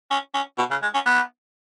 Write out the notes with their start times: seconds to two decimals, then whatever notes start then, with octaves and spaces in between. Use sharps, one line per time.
0.11 C#4
0.34 C#4
0.58 B2
0.71 C#3
0.82 G#3
0.94 C#4
1.06 B3